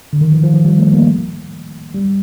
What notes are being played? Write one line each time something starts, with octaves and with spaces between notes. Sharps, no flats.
D3
D#3
F3
F3
F3
G3
A3
A#3
G3